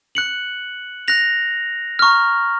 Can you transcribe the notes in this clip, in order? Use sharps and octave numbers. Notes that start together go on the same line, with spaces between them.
F#6 C#7 F#7
F#6 A#6 F7
A#5 C#6 F6